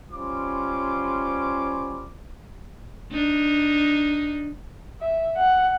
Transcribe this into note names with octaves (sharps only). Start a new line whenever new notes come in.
G3 C#4 F4 C5 D6
D4 D#4
E5
F#5